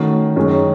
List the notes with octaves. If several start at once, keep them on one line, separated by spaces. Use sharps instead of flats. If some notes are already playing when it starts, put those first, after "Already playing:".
Already playing: D#3 A3 C#4 F#4
F#2 D#3 G#3 C#4 G#4